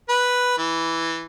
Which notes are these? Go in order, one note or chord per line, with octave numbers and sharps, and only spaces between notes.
B4
E3